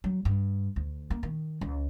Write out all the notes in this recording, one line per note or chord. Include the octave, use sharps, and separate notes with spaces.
F#3
G2
D2
A#3
D#3
C#2